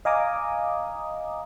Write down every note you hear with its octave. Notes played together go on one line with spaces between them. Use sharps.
D#5 F5 G#5 A#5 D6 D#6